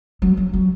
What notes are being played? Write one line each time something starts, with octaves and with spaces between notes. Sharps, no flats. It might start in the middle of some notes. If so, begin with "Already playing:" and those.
F#3
F#3
F#3